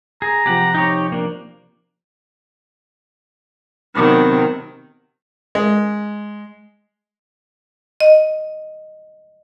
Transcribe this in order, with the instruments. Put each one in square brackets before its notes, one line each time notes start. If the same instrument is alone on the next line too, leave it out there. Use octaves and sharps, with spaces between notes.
[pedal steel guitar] G#4 [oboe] A#5
[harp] C3 F3 [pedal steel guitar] G4 F#5
[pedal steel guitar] D#4 G4 C#5
A#3 D4
[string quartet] C3 D#3 F#3 [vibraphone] B3 C4 B5
[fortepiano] G#3
[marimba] D#5